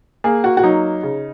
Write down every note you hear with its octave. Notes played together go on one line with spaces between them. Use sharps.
A#3 G#4
F#4
F#4
F#3 D#4
C#3